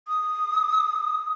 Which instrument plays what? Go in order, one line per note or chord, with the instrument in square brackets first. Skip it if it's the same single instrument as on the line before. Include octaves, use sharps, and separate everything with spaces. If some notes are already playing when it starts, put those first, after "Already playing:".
[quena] D#6